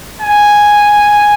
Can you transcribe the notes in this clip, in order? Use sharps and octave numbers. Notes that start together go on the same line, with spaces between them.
G#5